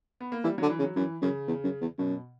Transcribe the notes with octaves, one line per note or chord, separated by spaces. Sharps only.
B3
A#3
E3 G3
F#3
D3
E3
C#3
F#3
F#2 E3
F#2 C#3
E2
F#2
E2
F#2 B2